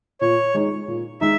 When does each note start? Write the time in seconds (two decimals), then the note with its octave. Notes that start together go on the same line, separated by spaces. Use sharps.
0.21 A#2 C#5
0.54 G#3 D#4
0.88 A#2
1.21 G#3 D#4 E5